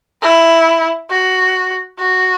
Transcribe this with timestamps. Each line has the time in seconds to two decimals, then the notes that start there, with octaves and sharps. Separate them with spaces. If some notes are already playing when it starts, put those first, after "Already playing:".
0.22 E4
1.11 F#4
1.99 F#4